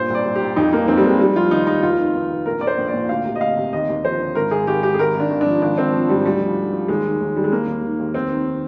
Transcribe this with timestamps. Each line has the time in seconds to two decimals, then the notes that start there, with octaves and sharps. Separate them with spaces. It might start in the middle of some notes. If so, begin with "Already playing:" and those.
Already playing: G2 A#2 C5
0.09 C2
0.15 D5
0.25 C2
0.35 G4
0.41 C2
0.56 F2 D#4
0.72 F1 A#3
0.88 F2 C4
0.97 G3
1.04 F1 G#3
1.20 F1 G3
1.35 F3 F4
1.51 D#2 D#4
1.67 F1 D#4
1.83 F1 F4
1.99 D#3
2.14 F1
2.31 F1
2.46 A#1 A#4
2.61 A#1 D5
2.67 C5
2.78 A#1
2.88 D5
2.93 A#2
3.09 D2 F5
3.25 C3
3.35 D#5
3.41 D2 F5
3.57 C3
3.73 D#2 D#5
3.89 D#2
4.04 F3 C5
4.19 D3
4.35 G#1 A#4
4.51 G#1 G#4
4.67 G#1 G4
4.83 G#1 G4
4.94 G#4
4.99 G#1 A#4
5.15 G#1
5.20 D4
5.30 G#1
5.41 D4
5.46 F3
5.62 G#1 D4
5.78 G#1 C4
5.93 F3
6.10 G#2 G3
6.25 D2 G3
6.41 F3
6.57 D3
6.72 F3
6.88 D#2 G#3
7.04 D#3
7.20 D#2
7.35 D#3 G3
7.44 G#3
7.51 D#3 A#3
7.67 D#2
7.83 D#3
7.99 D#2
8.14 F1 C4
8.31 D#3